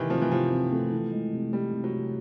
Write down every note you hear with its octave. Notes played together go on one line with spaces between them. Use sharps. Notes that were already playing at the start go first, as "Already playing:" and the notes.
Already playing: C3 D#3 E3 C4
F3 C4
E3
C3 F3
C4
A3
E3
G#3
C3
G3 G#3
C3
F#3
C3